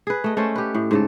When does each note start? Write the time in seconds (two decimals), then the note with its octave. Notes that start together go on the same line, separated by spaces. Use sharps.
0.07 G#4 B4
0.24 A3 D#5
0.37 A3 C#4 A4 C5
0.56 G4 B4
0.75 A2
0.91 G#2 C#3 A4